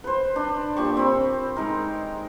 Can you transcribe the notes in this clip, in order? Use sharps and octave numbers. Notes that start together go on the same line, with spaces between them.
B4 C5
D4
A#2 G4 C#6
C4 B5
G#3 D#4 A#4